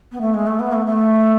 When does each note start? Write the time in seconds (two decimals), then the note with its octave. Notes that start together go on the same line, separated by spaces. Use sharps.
0.11 B3
0.21 A3
0.34 G#3
0.47 A3
0.59 B3
0.73 A3
0.86 A3